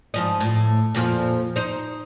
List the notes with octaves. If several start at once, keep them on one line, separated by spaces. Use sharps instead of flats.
G#2 F3 D#5
A2
F2 A#2 F3
D#4 C5